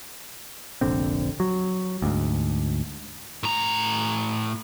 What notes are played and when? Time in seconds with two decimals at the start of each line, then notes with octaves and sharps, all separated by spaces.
0.81 F1 A#1 D3 C4
1.40 F#3
2.02 D2 G#2
3.43 A2 A#5